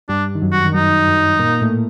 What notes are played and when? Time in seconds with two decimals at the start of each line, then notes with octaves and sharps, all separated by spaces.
0.09 G2 G3 D4
0.35 D#3
0.42 F#2 F#3
0.52 F#4
0.65 D#3
0.74 F#2 F#3 D#4
1.07 F#2 F#3
1.39 A#2 A#3
1.61 A2 A3